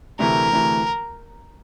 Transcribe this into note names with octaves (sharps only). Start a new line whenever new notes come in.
D2 C3 E3 A3 A#4
D2 C3 E3 A3